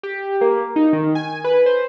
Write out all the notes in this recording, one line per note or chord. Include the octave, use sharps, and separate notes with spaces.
G4
A#3
D#4
D#3
G#5
B4
C5